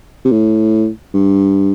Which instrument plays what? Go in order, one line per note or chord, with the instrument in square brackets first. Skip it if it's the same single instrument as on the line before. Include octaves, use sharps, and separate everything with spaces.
[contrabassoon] C3
A2
G2